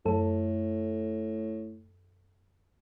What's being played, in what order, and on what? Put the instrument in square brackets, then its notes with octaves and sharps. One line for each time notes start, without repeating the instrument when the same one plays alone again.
[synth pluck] F#2 A4 [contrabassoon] A2